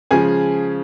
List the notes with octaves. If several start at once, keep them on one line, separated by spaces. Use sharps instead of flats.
C#3 F3 G#3 G#4 G#5